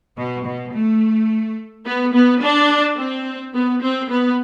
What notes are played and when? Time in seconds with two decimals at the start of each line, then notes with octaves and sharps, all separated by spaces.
0.17 B2
0.46 B2
0.73 A3
1.85 B3
2.14 B3
2.41 D4
2.98 C4
3.54 B3
3.82 C4
4.10 B3